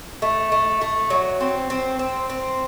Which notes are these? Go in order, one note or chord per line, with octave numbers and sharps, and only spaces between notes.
A3
A3
A3
F#3
C4
C4
C4
C4